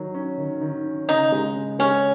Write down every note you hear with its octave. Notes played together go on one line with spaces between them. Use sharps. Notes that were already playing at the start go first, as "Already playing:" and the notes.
Already playing: D#3 F#3
C#4
D#3
D#3
C#4
C#3 D#4
G#3
C#3
G#3 C#4